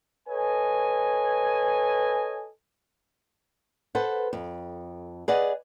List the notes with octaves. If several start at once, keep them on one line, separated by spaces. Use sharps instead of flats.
A4 B4 C#5 D#5 G#5
A4 B4 C5 F#5
F2
G#4 B4 D5 D#5 F#5